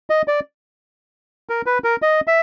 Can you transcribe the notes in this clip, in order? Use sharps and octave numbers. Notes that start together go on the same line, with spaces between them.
D#5
D5
A#4
B4
A#4
D#5
E5